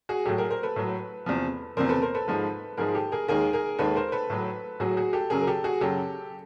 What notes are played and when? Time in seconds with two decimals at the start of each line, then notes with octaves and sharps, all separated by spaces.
0.09 F#4 G#4
0.25 A2 F#3 G4 A4
0.38 G#4 A#4
0.50 A#4 C5
0.63 A4 B4
0.76 A2 F#3
1.26 E2 C3 F3
1.77 E2 C3 F3 A#4 C5
1.89 A4 B4
2.02 A#4 C5
2.15 A4 B4
2.28 G#2 F3 G#3
2.77 G#2 F3 G#3 G#4 A#4
2.95 G4 A4
3.12 G#4 A#4
3.28 D#2 D#3 G#3 G#4 A#4
3.53 G#4 A#4
3.79 D#2 D#3 G#3 A4 B4
3.96 A#4 C5
4.12 A4 B4
4.30 A2 F#3
4.80 A2 F#3 F#4 G#4
4.97 F#4 G#4
5.13 G4 A4
5.30 F#2 C#3 F#3 G#4 A#4
5.41 A#4
5.47 G4 A4
5.64 F#4 G#4
5.81 F#2 C#3 F#3 G4 A4